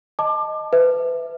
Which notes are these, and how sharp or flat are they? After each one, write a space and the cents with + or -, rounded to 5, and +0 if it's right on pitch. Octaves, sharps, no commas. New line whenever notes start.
D#5 +0 A5 +0 D6 +25
B4 +30 E5 +0